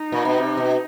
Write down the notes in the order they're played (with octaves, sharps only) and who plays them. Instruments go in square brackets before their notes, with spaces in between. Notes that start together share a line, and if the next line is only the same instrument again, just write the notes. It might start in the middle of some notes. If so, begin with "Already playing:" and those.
Already playing: [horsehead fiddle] D#4
[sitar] A#2
B2
C3
B2